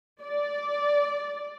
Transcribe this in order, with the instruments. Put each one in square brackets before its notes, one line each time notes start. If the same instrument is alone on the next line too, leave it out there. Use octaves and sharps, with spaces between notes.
[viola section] D5